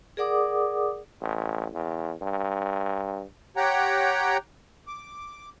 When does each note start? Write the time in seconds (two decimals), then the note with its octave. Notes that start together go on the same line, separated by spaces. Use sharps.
0.17 G#4 A#4 D5 F#5 D6 D#6
1.22 A1
1.74 E2
2.22 G2
3.57 G4 C#5 F#5 G5 A#5
4.87 D6